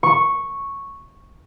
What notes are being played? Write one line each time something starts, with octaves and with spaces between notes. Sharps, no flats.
C#6